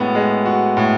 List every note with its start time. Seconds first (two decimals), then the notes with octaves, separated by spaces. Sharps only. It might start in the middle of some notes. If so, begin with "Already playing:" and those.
Already playing: A2 G#3 B3 F#4
0.15 G#3
0.45 F#4
0.77 A2